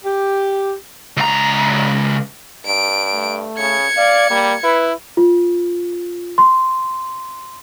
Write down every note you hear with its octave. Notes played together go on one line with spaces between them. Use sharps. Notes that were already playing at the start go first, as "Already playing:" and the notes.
G4
C#2 A#5
G2 D7
A3
C#3 G#6 C#7
D5 F5
G3 A#3
E4 B4
F4
C6